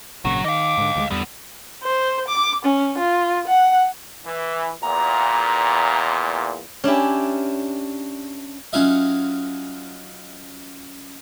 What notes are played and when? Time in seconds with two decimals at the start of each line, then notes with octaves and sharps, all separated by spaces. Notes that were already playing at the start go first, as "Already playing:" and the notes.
0.25 G#1 A#2 C#3 F#3 C#6
0.44 D#3 D#5 F5 D6
0.78 G#2 D3
0.95 D2 E3 G#3
1.11 E2 D3 G3 B3
1.83 C5
2.28 D6
2.65 C#4
2.98 F4
3.47 F#5
4.26 E3
4.83 E2 A#2 A#5
6.84 C#4 D4 E4 G4
8.73 F#3 C#4 D#4 F4 D#5 E5